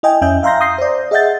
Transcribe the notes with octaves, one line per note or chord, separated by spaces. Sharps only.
E4 D#5 G5 G#5
F2 C#4 D#5 E5 G#5 G6
E5 F5 A#5 C6 G6 A#6
D#6 G6 A#6 C7
C5 D5
G#4 D#5 E5 F#5 G6 A6